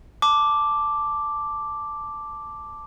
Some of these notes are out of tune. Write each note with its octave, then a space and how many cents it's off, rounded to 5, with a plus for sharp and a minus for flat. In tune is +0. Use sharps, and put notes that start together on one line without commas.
A5 +0 D6 +0